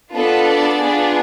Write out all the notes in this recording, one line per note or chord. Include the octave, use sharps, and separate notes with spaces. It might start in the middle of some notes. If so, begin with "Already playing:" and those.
B3 D4 F4 A4
D5
B3 D4 F4 G#4